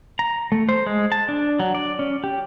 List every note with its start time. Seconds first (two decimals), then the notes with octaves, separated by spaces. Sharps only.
0.19 A#5
0.52 A3
0.69 C5
0.87 G#3
1.12 A5
1.29 D4
1.59 F#3
1.75 D5
1.99 C#4
2.24 G4